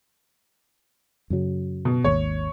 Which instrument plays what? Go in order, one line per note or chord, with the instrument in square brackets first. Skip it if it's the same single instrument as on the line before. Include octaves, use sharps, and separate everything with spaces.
[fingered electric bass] F#2 C#3 F#3
[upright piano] B2
[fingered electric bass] G#1 D#2 [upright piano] C#5